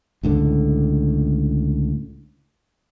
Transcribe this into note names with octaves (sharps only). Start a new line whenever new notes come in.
C#2 A2 D3